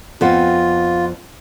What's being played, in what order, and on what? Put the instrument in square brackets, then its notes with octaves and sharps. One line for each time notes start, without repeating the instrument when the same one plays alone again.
[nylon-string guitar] F2 B3 C4 [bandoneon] F4